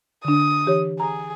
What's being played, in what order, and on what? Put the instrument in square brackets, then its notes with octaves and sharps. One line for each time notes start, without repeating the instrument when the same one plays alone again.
[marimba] D3 D4 [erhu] D#6
[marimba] E3 G4 C#5
[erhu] G#4 [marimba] A#5